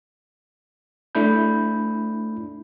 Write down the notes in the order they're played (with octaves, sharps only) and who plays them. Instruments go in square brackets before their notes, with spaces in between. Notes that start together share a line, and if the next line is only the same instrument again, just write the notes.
[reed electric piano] A3 D4 E4 B5 G6